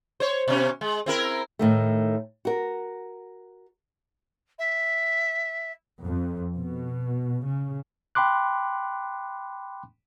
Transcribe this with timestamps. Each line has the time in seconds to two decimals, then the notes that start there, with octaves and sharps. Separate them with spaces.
0.20 C5 C#5
0.48 B2 C#4
0.81 G#3
1.06 C4 E4 A#4
1.59 A2 D#3 A3
2.45 F#4 A#4
4.59 E5
6.04 F2
6.55 B2
7.43 C#3
8.15 G5 B5 C6 D6 F#6